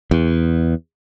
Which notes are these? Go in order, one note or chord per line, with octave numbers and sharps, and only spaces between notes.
E2